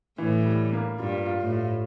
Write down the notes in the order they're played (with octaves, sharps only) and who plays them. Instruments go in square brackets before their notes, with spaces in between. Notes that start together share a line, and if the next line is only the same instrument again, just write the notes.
[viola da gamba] A2 [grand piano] E3
[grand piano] G3
A#3
[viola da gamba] G2 [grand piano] F4
[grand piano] F4
[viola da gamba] A2
[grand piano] F4